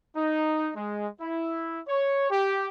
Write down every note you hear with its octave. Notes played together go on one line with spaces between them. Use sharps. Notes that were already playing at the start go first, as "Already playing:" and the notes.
D#4
G#3
E4
C#5
G4